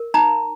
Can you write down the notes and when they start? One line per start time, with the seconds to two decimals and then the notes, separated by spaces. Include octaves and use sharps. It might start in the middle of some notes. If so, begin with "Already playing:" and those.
Already playing: A#4
0.14 D#4 A#5